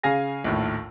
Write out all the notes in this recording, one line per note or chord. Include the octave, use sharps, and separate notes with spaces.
C#3 G#4 F5 G#5 A#6
A#1 D#2 A2